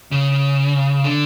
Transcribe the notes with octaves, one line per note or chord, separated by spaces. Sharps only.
C#3
D3